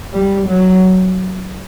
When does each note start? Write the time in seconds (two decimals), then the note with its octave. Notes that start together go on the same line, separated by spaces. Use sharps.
0.13 G3
0.48 F#3